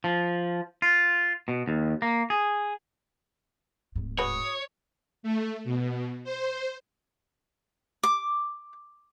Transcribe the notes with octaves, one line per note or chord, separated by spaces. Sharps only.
F3
F4
B2
D#2
A#3
G#4
D1 G#2
F#4 G#4 B4 C#5 D#6
A3
B2
C5
D6